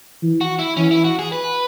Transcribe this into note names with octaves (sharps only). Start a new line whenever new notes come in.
E3
F#4
E4
E3 C#4
E4
F#4
G#4
B4